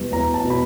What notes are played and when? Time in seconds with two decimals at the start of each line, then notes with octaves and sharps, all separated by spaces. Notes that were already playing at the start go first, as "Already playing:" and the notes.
Already playing: E2 B2 G3 B3
0.12 E2 A#5
0.34 A5
0.45 B2
0.50 B5